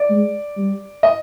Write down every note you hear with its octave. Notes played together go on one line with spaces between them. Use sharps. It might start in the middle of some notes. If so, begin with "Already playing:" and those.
Already playing: D5
G#3
G3
D#5